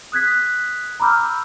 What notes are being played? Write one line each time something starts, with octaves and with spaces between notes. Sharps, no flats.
D#6 F#6 G#6 B6
A#5 B5 D6 E6 F6 G6